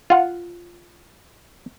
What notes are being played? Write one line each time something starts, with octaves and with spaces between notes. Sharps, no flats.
F4 F#5